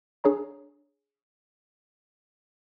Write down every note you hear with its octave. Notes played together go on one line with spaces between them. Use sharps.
D4 G#4 C#5 A#5